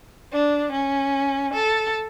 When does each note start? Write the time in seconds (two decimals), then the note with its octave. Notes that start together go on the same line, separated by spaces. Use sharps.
0.32 D4
0.72 C#4
1.53 A4